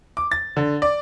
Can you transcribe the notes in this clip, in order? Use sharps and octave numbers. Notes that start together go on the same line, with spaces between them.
D6
A6
D3
D5